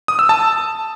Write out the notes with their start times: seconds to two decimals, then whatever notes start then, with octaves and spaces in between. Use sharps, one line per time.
0.08 D#6
0.19 E6
0.29 A5